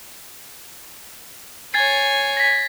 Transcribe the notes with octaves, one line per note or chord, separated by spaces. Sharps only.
C#5 G#5 G#6 A6 C7
A#6 B6